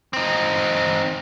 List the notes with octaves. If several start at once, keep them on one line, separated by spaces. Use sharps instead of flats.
C4 D#4